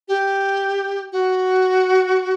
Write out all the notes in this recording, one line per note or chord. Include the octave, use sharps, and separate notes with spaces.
G4
F#4